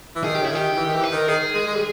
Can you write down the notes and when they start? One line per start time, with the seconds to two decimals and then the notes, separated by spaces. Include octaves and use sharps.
0.16 E3
0.24 D#3 G#4
0.35 G4
0.42 C#3 E4
0.51 D#3 G4
0.77 E3
0.86 D#3
0.94 E3
1.04 B4
1.12 D#3 A#4
1.28 D#3 G#4
1.54 G#3
1.67 G#3
1.76 G3